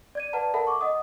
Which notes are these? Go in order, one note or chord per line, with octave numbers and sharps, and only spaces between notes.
D5 G#6 D#7
B4 D5 F#5 A5 A#5
A4 A#4 E5 F#5 A5 B5
C#6 D6
D#5 F#5 D#6